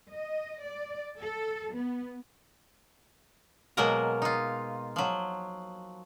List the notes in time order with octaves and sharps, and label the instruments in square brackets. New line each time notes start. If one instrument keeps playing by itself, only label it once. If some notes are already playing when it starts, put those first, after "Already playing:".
[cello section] D#5
D5
A4
B3
[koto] B2 F#3 G#3 A#3 A#4 A#5
D#4 F4
F3 F#3